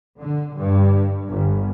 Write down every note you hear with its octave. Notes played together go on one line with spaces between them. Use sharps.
D3
G2
G1